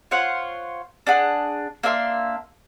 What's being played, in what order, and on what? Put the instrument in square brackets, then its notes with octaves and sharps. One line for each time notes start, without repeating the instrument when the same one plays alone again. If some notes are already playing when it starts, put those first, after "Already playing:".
[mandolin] F4 C5 C#5 F#5
D4 G#4 F#5
A#3 D4 E5 C6